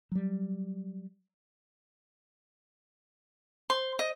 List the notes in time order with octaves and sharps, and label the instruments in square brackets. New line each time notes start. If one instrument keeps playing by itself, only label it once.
[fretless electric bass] F#3 G3
[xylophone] C5 [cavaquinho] C6
[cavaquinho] D#5